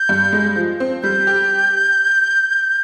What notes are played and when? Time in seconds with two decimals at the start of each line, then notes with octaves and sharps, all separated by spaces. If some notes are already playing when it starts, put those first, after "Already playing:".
Already playing: G6
0.09 G2
0.33 G#3
0.56 F3
0.80 C4
1.03 G3 G6
1.27 G4